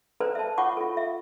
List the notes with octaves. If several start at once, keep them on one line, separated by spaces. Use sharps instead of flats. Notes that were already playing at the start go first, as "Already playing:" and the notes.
A4 B4 C5 D5 A#5
E5 A5
F4 C#5 F#5 C#6 D6
F4 A4
E5